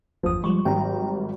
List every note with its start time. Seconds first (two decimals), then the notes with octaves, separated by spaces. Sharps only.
0.23 G1 E2 F3 D#6
0.44 F3 G3 G#3 C#6
0.65 G#1 F#3 G3 G5 A#5